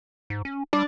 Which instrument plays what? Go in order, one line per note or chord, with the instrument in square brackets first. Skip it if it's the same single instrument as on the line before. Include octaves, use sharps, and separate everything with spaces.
[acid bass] G#2
C#4
[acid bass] G3 [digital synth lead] D4 [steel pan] D5